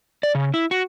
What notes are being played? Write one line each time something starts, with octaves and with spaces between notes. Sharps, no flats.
D5
C#3
E4
F#4